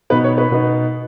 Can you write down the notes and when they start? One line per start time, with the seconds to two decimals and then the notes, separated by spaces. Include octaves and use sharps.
0.10 B2 B3 D#4 B4
0.24 C#5
0.38 B4
0.51 B2 B3 D#4